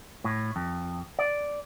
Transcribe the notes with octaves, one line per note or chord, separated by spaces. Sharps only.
A2
F2
D5